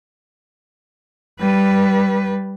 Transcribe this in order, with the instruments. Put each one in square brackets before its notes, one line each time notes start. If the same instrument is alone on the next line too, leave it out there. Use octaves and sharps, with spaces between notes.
[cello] G3 B4